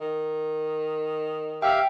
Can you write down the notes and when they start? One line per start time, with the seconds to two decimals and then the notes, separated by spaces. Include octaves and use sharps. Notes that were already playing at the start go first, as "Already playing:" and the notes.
0.01 D#3
1.62 G4 E5 F5 G5